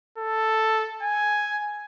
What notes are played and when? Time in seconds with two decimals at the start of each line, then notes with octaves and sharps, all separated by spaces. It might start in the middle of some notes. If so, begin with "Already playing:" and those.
0.19 A4
1.03 G#5